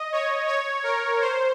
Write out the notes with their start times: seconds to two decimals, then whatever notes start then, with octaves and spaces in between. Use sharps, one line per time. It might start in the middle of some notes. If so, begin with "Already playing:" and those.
Already playing: D#5
0.12 C#5
0.48 C#5
0.84 A#4
1.21 C5